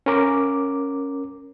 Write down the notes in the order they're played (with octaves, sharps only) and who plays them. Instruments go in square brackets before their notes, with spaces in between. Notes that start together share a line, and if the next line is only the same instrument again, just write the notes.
[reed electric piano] C#4 A#4 D6